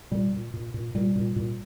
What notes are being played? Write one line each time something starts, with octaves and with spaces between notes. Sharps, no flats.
A#2 G3
A#2
A#2
A#2
A#2 G3
A#2
A#2